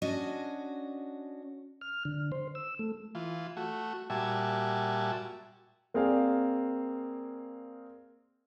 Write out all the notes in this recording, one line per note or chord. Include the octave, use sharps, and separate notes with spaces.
C#4 D4 F#4 D#5
F6
D3
C5
E6
A3
E3 F4
A3 F#4
A#2 G3 F#4 E5 G#5 A5
A#3 C4 G#4 D5 F5